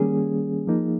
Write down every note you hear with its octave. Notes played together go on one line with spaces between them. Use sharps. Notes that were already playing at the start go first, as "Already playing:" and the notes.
Already playing: D#3 G3 A#3 C#4 G#4
F3 A#3 D#4